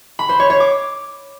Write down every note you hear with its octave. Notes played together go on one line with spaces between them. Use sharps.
B5
C5
C#5
C#5
D6